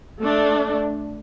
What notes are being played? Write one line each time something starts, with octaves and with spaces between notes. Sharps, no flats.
A3 D4